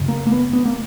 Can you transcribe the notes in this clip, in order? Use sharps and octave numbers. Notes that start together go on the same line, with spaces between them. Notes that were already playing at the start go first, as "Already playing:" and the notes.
Already playing: F#2 C#3
A#3
A#3
B3
B3
A#3